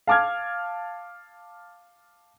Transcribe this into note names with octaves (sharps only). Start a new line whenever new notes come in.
F5 A5 D6 F6 G#6